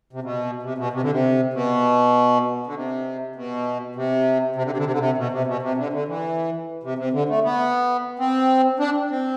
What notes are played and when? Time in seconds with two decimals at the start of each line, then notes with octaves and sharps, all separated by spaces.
0.13 C3
0.23 B2
0.63 C3
0.78 B2
0.93 C3
1.02 D3
1.11 C3
1.53 B2
2.67 D3
2.75 C3
3.36 B2
3.96 C3
4.56 C3
4.64 D3
4.71 C3
4.77 D3
4.85 C3
4.92 D3
4.99 C3
5.17 B2
5.32 C3
5.47 B2
5.62 C3
5.77 D3
5.93 D3
6.08 E3
6.83 C3
6.98 C3
7.13 D3
7.29 A3
7.44 B3
8.19 C4
8.80 D4
9.10 C4